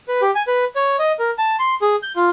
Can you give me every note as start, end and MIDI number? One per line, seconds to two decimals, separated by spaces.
0.08 0.21 71
0.22 0.31 67
0.35 0.43 80
0.47 0.65 71
0.76 0.97 73
0.99 1.12 75
1.19 1.31 70
1.38 1.56 81
1.59 1.75 84
1.82 1.96 68
2.03 2.12 91
2.16 2.30 65